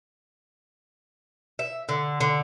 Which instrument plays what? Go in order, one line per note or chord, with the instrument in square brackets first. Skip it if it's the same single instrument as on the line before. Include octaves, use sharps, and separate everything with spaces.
[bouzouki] E5
D3
D3